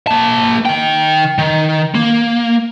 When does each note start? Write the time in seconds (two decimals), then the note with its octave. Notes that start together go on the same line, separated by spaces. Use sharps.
0.07 A#3 A5
0.66 D#3 G5
1.38 D#3
1.95 A#3